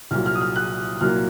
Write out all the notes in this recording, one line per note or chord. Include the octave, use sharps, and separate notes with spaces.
C2 A#2 F#3 F6
F6
D#6
F6
F#6
C2 A#2 F#3 A#3 F6